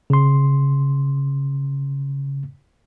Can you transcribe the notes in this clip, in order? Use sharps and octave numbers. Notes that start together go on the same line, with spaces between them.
C#3 C6